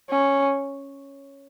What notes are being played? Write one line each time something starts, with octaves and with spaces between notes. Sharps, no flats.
C#4